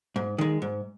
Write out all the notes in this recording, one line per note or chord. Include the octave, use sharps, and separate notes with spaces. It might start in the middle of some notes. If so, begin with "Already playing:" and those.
G#2
D#3 G#3
G#2